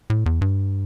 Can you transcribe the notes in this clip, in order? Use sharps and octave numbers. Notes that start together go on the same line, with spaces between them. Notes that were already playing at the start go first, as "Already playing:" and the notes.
A2
E2
G2